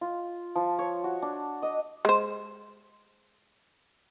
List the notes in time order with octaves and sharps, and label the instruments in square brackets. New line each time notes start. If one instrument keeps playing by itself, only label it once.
[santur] F4
F3
C#5
F#4
D4
D#5
[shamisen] G#3 C5